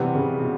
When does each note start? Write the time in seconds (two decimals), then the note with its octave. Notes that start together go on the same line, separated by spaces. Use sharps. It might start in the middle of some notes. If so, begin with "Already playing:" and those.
Already playing: C3 E3 G3 B3
0.15 C#3
0.40 B2